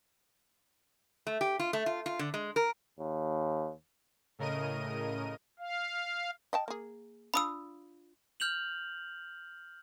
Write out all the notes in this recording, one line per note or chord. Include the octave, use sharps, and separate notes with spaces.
A3
G4
F4
A3
F4
F4
D3
G#3
A#4
D#2
A2 C#3 A#4 D#5 D#7
F5
D#5 G5 A5
A#3 G#4
D4 F4 B5 D#6 E6
F6 G6 F7 F#7